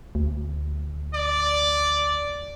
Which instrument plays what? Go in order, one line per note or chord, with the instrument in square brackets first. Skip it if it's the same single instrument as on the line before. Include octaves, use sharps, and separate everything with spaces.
[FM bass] D2
[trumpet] D5